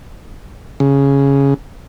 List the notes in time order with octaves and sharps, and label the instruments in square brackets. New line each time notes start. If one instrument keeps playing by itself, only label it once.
[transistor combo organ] C#3